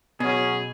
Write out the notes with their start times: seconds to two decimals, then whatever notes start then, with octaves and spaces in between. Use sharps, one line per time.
0.20 B2 F#3 C#4 G#4